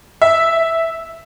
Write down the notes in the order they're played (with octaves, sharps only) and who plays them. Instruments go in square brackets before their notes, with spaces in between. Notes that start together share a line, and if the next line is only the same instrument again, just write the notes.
[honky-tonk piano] E5